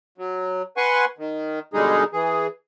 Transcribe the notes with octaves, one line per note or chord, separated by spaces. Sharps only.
F#3
B4 F#5 G#5 C6 C#6
D#3
B2 D3 G3 G#3 D#4 G#4
E3 G#4